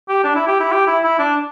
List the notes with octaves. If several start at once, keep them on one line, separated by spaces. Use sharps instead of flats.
G4
D4
E4
G4
E4
G4
E4
E4
D4